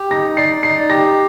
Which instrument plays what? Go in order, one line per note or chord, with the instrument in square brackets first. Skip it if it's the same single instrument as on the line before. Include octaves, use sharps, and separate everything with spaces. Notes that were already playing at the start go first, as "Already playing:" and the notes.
Already playing: [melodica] G4
[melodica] D#4 [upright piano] A#6
[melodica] D5 [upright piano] C7
[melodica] D#4 [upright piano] C7
[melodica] G4 [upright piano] A#6